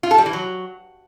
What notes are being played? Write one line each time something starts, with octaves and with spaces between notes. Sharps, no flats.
F4
A4
G3
E3
F#3